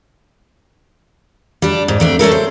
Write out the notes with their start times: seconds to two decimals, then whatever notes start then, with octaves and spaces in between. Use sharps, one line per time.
1.62 G3 D4
1.88 G#2
2.00 F2 A3 D4
2.19 A3 C#4 A4 A#4
2.31 C5